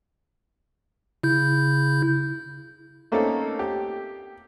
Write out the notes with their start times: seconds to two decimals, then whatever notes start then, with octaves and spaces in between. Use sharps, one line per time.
1.23 C#3 E4 G6
3.12 A3 A#3 C4 C#4 D#4 A4
3.59 G4